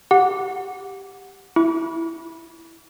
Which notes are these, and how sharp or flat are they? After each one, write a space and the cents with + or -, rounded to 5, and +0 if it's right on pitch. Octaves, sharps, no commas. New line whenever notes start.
G4 +0 F#5 -15
E4 +0 D6 -45